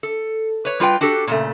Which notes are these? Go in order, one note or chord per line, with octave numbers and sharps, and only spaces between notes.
A4
B4 C#5
G3 F4 B4 G5
D4 F#4 G4 A4
A#2 C#3 A3